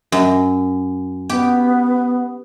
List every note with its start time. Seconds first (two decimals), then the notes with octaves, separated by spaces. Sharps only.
0.12 F#2
1.29 B3 G4